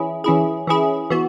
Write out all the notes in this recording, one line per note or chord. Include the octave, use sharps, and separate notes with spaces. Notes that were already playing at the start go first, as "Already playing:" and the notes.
Already playing: E3 C#4 E4 G#4
E3 C#4 E4 G#4
E3 C#4 E4 G#4
E3 B3 F#4